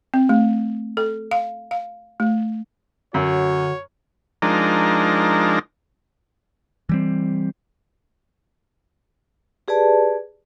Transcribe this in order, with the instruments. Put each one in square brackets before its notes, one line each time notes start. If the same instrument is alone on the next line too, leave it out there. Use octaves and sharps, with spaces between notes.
[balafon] C4
A3
A4
F5
F5
A3
[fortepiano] F#2 [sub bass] D3 [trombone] F#4 [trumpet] C#5
[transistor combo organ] F3 G#3 D4 D#4 A#4
[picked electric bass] E3 G3 C4
[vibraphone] G4 G#4 B4 D5 A5